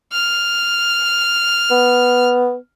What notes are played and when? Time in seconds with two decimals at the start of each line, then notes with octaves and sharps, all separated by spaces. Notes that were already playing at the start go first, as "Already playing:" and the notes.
0.13 F6
1.71 B3